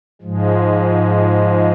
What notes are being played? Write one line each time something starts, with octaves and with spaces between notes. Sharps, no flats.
G#2 F3 G#3